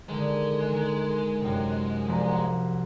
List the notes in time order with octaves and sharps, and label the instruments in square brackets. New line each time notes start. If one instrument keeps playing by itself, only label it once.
[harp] D3 D#3 [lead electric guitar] G#3
[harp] D#3
F#2 C3
C2 F3 A#5
F#5